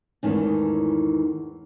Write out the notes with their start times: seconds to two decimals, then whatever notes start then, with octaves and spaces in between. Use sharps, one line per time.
0.23 E2 G#2 D#3 E3 A3 C#4